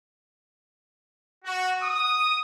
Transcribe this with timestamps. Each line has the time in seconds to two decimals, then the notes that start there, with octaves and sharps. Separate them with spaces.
1.44 F#4
1.81 D#6